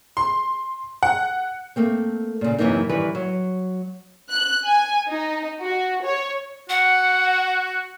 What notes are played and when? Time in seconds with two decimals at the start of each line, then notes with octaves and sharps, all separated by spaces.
0.17 C6
1.03 F#5
1.76 A3 A#3 C4
2.41 A#2 C#3
2.58 F#2 C3 E3 A#3 D#4
2.89 D#3 E3 G3 B4
3.15 F#3
4.28 F#6
4.66 G#5
5.08 D#4
5.60 F#4
6.04 C#5
6.69 F#4 F#5